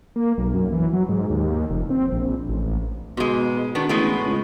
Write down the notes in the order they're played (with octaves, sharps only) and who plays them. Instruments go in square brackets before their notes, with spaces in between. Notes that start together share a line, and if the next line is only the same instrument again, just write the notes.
[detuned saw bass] A#3
B1
F#2
E3
F#3
G#2
D#2
F1
C4
A#1
A1
[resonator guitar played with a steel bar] G#2 G#3 [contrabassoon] B2
[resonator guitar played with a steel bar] D#3 B3 D4
[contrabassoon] A1 [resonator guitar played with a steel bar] A2 G#3 B3
[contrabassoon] C#2